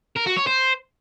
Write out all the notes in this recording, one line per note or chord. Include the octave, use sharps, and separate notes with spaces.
A#4
F#4
C#5
C5